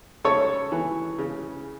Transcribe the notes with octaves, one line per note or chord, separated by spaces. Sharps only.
C#3 A4 C#5
E3
C#3